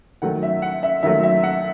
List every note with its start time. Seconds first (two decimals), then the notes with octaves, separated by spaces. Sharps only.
0.22 D#3 F#3 A3 F#5
0.43 E5
0.62 F#5
0.83 E5
1.03 D#3 F#3 A3 E5
1.24 E5
1.43 F#5